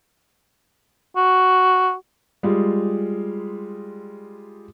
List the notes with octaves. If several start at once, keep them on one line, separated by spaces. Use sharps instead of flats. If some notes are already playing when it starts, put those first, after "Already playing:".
F#4
G3 G#3 F4